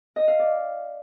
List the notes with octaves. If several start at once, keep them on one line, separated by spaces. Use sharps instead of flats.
D#5
F5
D5